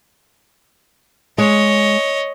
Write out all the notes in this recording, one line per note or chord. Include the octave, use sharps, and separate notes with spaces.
G#3 C#5 D#5